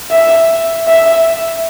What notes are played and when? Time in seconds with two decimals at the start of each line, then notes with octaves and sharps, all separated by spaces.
0.11 E5
0.87 E5